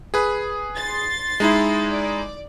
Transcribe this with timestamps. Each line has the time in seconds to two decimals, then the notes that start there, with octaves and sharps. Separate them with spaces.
0.14 G#4 B4
0.76 C6 A6
1.40 G#3 D#4 E4
1.88 D5